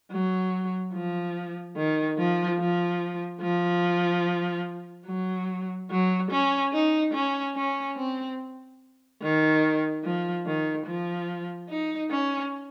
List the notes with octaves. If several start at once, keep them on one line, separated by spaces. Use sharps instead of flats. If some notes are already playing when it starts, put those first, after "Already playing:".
F#3
F3
D#3
F3
F3
F3
F#3
F#3
C#4
D#4
C#4
C#4
C4
D#3
F3
D#3
F3
D#4
C#4